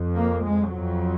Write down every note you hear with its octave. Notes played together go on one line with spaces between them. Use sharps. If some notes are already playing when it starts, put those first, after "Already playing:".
Already playing: F2
A#3
G#3
F2 F#3